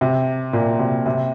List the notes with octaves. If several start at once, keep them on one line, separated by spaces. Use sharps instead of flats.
C3
A#2
C3
C3